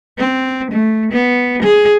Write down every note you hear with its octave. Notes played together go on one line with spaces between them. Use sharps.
C4
A3
B3
G#4